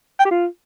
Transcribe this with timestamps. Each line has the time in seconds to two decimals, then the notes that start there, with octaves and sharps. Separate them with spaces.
0.19 G5
0.25 G4
0.31 F4